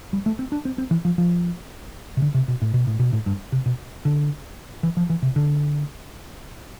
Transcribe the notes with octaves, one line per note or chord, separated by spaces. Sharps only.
G3
A3
C4
D4
C4
C4
E3
F3
F3
C3
D3
C3
B2
A2
B2
A2
B2
A2
G2
C3
B2
D3
E3
F3
E3
C3
D3